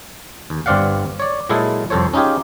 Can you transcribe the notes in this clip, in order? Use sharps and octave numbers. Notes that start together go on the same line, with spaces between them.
D#2
G1 G2 C4 D5 F5 F#5
C#5 D5
A#2 F#3 G#3 E4 G#4 A4
C2 F2 A4 C5 C#5
C#4 D#4 F4 G4 G#4